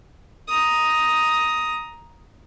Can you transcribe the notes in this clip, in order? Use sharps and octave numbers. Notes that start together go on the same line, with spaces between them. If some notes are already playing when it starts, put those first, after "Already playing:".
A#5 D#6